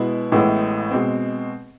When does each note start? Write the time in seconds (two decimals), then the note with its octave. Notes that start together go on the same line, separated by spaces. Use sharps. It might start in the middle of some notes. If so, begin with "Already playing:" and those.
Already playing: B2 G#3 B3 E4
0.32 A1 A2 G#3 B3 E4
0.91 B2 G#3 C4